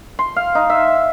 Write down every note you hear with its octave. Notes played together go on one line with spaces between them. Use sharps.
C6
F5
D#4
E5